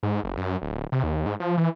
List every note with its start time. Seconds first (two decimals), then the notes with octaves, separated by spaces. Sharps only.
0.03 G#2
0.23 F#1
0.37 F#2
0.62 D1
0.92 C3
1.04 D#2
1.26 G#2
1.40 F3
1.57 E3